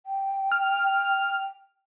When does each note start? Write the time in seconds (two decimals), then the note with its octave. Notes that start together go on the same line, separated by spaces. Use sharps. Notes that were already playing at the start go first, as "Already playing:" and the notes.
0.06 G5
0.52 F6